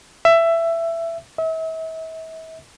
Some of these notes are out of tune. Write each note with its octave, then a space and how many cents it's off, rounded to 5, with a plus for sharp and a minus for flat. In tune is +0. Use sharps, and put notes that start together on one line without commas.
E5 +15
E5 -40